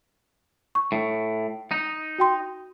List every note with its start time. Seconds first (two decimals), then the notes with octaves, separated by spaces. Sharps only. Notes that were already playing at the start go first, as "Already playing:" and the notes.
0.75 C#6
0.92 A2
1.71 D#4
2.19 F#4 G5 C6